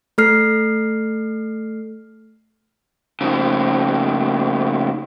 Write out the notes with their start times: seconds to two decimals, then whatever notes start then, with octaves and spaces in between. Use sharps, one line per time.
0.18 A3 A4 F6 C7
3.21 F2 C#3